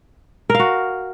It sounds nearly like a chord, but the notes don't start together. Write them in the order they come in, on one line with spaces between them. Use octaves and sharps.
A#4 F5 F#4